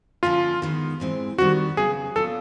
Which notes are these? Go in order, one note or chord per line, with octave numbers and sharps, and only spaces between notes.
D3 F3 A#3 C#4 F4
D#3 G#3 B3
G#2 E3 G#3 C4
D#3 G3 C4 F#4
C#3 F#3 B3 G#4
A#2 F#3 B3 D4 F4 A4